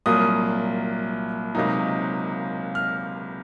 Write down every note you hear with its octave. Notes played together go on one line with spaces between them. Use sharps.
C2 A#2 F#3 A#3 D#6
C#2 C3 F#3 A#3 D#4
F6